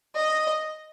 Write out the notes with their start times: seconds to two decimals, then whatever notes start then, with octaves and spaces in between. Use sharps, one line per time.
0.16 D#5